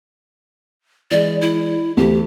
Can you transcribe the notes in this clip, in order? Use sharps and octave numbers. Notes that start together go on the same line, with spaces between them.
E3 G#3 D5
E4
D2 E3 G4